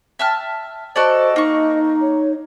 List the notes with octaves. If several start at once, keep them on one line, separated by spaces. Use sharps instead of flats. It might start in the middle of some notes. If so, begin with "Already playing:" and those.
E5 A5 F6
F#4 A4 C5 D5 D#5
A#3 D#4 C#6
C#5